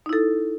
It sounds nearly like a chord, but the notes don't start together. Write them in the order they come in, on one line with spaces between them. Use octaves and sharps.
D#4 E4 A4